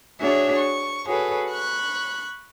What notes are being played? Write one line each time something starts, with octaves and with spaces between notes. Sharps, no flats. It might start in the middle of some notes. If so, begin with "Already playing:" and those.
D4 F#4 G#4 C#5 E5
C#6
F#4 G#4 A4 B4 C#5
B5 C#6 F#6